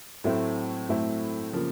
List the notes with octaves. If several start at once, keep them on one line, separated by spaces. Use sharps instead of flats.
A2 F#3 A3 C4 E4
A2 F#3 A3 C4 E4
C#3 F3 A#3